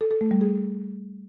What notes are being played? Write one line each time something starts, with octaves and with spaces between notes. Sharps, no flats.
A4
A4
A3
G3
G#4